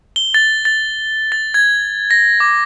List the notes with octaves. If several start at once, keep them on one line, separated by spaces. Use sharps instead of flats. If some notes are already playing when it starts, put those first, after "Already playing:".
G7
A6
A6
A6
G#6
A#6
D6